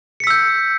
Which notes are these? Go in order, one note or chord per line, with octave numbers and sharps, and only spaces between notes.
E6 G6 B6 C#7